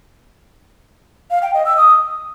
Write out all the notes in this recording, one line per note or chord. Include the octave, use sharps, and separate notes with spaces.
F5
G5
D#5
E6
D#6